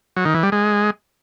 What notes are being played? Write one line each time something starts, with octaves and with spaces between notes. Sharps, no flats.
F#3
D#3
E3
G3
G#3